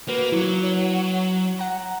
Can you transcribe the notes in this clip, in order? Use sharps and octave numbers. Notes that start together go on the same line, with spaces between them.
A#3 F#4 B4
F#3 E4
C#5
F#5 A#5